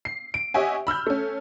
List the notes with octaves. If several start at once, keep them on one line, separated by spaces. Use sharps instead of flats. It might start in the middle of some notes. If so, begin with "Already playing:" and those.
C7
D7
G4 C#5 D#5 E5 F#5 G#5
B5 E6 F6 G6
A3 C#4